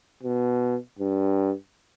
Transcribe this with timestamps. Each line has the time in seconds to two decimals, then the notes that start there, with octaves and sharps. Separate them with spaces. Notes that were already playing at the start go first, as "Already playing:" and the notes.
0.23 B2
0.99 G2